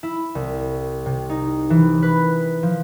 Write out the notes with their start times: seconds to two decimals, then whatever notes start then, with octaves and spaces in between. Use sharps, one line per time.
0.03 E4
0.35 C2
1.06 C3
1.30 D#4
1.70 E3
2.02 B4
2.63 F3